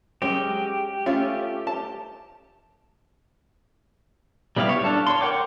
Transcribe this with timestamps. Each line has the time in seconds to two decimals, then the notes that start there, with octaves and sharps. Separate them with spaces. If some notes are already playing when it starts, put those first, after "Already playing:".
0.22 F#3 G#3 C#4 G4
1.06 A3 C#4 F4
1.67 A5
4.56 G3 B3 E4 G4 F5
4.69 C#5
4.82 D4 A4 F5
5.07 C#5 C6
5.21 A#4 F#5 G5 D6